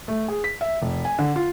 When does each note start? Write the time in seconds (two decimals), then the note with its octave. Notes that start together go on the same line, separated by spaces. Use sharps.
0.08 A3
0.28 G#4
0.44 B6
0.61 E5
0.82 F1
1.05 G#5
1.19 D3
1.36 F4